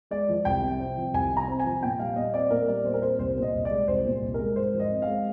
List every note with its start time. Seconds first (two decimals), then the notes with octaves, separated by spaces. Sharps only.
0.11 G#3 D5
0.29 F3
0.45 C2 G5
0.62 C3
0.80 C4
0.97 F3
1.14 C2 G#5
1.32 C3
1.37 A#5
1.48 C4
1.60 G#5
1.65 F3
1.83 A#2 G5
1.99 G3 F5
2.16 A#2 D#5
2.34 C4 D5
2.50 A#2 A#4
2.68 G3 D5
2.85 A#2 C5
2.94 A#4
3.02 C4 C5
3.19 C2 C5
3.37 A#2
3.42 D#5
3.54 C2
3.65 D5
3.71 G#3
3.88 C2 C5
4.05 A#2
4.22 C2
4.34 G#3 A#4
4.56 G#2 C5
4.73 F3
4.80 D#5
4.90 C4
5.02 F5
5.07 G#3